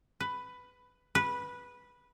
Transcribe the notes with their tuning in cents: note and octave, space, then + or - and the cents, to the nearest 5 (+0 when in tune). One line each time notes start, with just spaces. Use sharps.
B4 +10
B4 -10